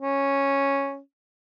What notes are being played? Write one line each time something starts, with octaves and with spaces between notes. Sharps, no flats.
C#4